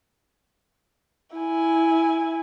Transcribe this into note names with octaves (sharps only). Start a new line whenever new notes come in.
E4 G#5